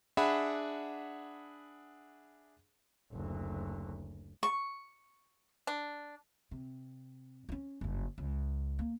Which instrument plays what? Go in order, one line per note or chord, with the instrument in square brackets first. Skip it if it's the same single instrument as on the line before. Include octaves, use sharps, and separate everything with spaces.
[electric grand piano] D4 G#4 E5 F#5 B5
[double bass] F#1 D2
[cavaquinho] C#6
[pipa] D4
[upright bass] C3
C#4 D#4
F#1 G2
C#2
A#3